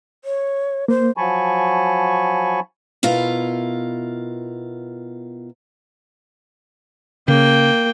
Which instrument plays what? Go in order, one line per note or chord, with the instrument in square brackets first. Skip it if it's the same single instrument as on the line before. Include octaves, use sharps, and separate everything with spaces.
[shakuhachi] C#5
[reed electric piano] A#3 [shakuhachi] C5
[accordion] F3 F#3 G#5 A5 B5 C#6
[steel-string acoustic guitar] B2 E4 F4 A#4
[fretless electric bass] C#3 [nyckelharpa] A#3 G5